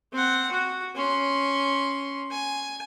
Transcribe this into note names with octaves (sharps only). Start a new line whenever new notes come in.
C4 F#5
F#4
C#4 C6
G#5